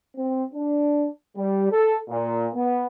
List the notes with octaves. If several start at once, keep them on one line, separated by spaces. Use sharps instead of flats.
C4
D4
G3
A4
A#2
B3